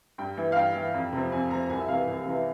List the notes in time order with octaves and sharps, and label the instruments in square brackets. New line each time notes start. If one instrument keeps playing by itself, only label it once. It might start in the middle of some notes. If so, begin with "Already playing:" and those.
[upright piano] G2 G5
E3
F5
G2 G5
E3
F2
C3 F3
F2 G#5
C3 F3 A#5
C2 G#5
E5
C3 E3 F5
C2
C3 E3